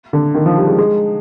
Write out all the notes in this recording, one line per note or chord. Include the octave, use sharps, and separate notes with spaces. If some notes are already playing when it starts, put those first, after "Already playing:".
D3
D#3
F3
G3
G#3
G#3